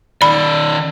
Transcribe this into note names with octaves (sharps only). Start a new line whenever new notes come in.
D#3 D5 B5